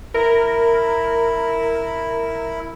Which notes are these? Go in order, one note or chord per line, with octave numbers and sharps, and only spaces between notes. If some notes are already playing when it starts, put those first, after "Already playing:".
E4 A#4